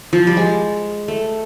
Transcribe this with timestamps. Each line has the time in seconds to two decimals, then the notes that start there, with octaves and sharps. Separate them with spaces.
0.13 F3
0.27 G3
0.37 G#3
1.08 A3